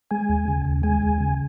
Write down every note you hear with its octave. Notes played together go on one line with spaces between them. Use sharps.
G#3 G#5
D#2
C#3
D#2
G#3 G#5
D#2
C#3